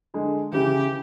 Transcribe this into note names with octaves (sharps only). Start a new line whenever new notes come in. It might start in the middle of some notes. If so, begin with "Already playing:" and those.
D3 G#3
C#3 E3 G4